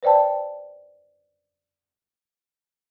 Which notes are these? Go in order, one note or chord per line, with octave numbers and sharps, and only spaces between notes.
B4 C5 D5 G5 A5